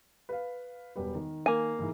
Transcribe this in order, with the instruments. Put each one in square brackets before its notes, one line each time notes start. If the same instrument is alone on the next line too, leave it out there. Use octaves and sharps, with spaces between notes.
[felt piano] B4 F5
E1 G3 B4
D#3
[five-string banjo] A#3 G#5
[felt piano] G#2 E3